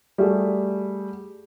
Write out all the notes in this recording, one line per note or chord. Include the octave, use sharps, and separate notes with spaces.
G3 A3 F#4 G#4